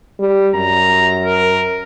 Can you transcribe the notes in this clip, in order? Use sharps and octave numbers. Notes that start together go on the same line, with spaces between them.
G3
F#2 A#5
A#4